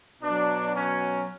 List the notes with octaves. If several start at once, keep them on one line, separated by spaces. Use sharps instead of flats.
B2 F#3 D4
C#4